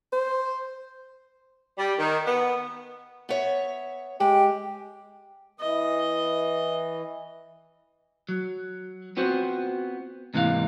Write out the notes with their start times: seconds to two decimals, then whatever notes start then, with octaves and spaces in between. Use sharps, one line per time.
0.13 C5
1.78 G3
1.99 D#3
2.26 B3
3.29 B3 C#5 E5
4.20 G#3 G4
5.60 E3 D#5
8.29 F#3
9.17 B3 C4 F4 F#4 C5
10.34 G#2 C3 E3 A#3 F5